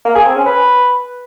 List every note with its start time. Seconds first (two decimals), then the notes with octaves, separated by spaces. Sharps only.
0.05 A#3
0.15 G#4
0.25 C4
0.36 C#4
0.46 B4